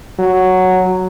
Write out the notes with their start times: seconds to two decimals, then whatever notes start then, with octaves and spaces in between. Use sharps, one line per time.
0.19 F#3